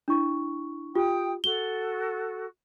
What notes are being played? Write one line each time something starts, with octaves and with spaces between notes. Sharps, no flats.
D4 E4 C#6
F4 G4 G5 D#6
F#4 A4 G7